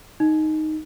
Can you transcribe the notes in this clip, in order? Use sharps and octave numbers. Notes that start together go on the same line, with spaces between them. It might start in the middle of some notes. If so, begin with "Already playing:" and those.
D#4